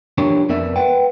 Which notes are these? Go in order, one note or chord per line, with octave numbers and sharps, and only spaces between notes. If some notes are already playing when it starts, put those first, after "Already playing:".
F3 D4 G4 A#4 C#5
F2 B3 A#4 D5 E5
B4 F#5 G5